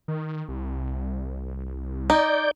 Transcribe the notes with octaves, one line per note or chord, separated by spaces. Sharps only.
D#3
C2
D#4 D5 G6